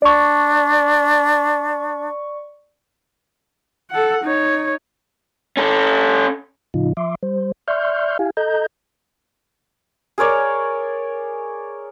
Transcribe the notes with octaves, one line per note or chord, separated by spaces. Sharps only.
D4 D5 C#6
A4 F#5
D#4 C#5
C#4 A4
A2 C#3 F3 D#4 F4
F3 E5 C6 D6
G3 C5
D5 E5 C6 C#6 F6 G6
E4 G4 F5 G#5
A4 D#5 A#5 G6
G#4 A#4 C#5 D5